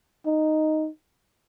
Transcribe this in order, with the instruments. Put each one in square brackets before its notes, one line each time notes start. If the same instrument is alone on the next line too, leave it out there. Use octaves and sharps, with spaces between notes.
[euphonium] D#4